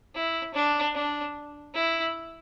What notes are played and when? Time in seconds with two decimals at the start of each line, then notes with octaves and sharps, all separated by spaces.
0.15 E4
0.54 D4
0.95 D4
1.74 E4